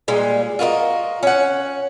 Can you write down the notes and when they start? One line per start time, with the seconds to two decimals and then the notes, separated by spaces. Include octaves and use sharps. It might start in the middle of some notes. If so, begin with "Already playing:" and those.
0.08 A#2 G3 G#3
0.59 F4 F#4 A#4 D#5
1.23 C#4 F#5